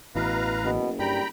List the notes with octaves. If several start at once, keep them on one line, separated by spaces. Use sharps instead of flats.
A1 B2 E3 B4 F5 A#5
F#1 B2
G2 G3 G5 A#5 B5